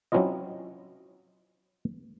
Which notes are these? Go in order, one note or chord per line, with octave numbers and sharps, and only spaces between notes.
F#3 C4 C#4 E4 F4 D#5